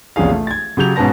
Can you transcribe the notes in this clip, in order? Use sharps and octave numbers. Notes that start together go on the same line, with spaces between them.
A#1 E2 C3 C#4 G#4 F5
A3
G#6 A6
C#3 F#3 G4 G6 F7
G#2 B2 C#4 B4 A5 A#6